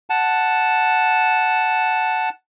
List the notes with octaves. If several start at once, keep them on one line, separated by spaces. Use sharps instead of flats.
F#5 A5